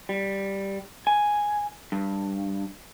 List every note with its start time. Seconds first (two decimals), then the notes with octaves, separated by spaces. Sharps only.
0.09 G3
1.07 G#5
1.92 G2